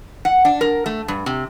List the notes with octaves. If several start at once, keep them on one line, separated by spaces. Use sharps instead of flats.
F#5
D4
A#4
A3
G2
C3